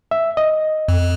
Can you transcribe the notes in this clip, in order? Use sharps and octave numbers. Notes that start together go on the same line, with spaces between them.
E5
D#5
F2